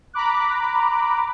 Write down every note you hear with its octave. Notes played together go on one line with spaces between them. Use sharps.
A#5 B5 D6 F#6